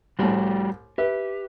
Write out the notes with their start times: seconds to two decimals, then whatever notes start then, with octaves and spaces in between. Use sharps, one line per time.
0.19 C2 A2 G3 F#4 G4
0.98 G4 B4 E5